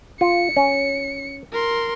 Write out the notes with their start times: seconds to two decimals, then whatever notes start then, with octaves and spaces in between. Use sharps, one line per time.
0.21 F4 C#7
0.56 C#4
1.53 A#4 C6